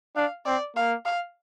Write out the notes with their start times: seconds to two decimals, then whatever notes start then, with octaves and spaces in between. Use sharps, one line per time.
0.16 D4 F5
0.46 C4 D5
0.76 A#3 F5
1.06 F5